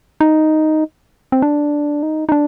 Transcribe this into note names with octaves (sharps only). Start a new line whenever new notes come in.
D#4
C4
D4
D#4
D#4
D4